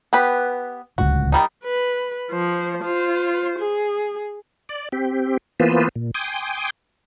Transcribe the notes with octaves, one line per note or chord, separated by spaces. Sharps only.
B3 G4 B4
D1 C#2 F#4
D#3 G3 D#4
B4
F3 C5
F4 C5
G#4
D5
C4 G4
E3 A#3 B3 F4 B4 C5
A#2
G5 G#5 C6 D6 D#6